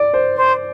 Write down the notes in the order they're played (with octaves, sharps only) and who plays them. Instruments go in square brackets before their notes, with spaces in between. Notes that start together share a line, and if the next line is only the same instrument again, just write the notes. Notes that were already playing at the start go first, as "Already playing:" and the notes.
Already playing: [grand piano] D5
C5
[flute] C5